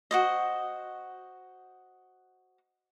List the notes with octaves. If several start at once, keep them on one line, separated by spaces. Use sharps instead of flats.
F#4 C5 D#5